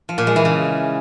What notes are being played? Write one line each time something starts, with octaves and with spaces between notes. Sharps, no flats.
F3
A#2
G#3
E3
C#3